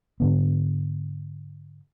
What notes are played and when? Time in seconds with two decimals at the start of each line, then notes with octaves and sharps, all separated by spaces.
0.20 G#2 D3 B3